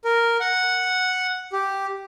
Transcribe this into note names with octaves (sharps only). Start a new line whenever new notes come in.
A#4
F#5
G4